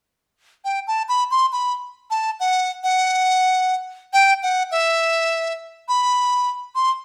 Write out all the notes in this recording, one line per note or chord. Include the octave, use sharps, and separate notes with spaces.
G5
A5
B5
C6
B5
A5
F#5
F#5
G5
F#5
E5
B5
C6